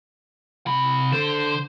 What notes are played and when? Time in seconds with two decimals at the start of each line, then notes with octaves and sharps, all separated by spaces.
0.66 C3 B5
1.13 D3 C5